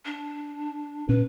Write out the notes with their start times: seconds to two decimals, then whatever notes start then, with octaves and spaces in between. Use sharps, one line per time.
0.06 D4
1.09 A#2 C#4 B4